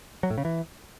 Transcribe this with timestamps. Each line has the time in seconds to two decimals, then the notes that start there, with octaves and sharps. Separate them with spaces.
0.23 F#3
0.30 A2
0.38 C#3
0.45 E3